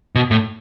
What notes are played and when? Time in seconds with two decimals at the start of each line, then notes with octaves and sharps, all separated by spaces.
0.15 B2
0.31 A2